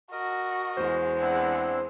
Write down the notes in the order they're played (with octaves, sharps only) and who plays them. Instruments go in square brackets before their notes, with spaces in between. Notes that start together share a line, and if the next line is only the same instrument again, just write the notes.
[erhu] F#4 [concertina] A#4 D#5
[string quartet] E2 G#3 [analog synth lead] C5
[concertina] C4 D4 E4 [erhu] F#5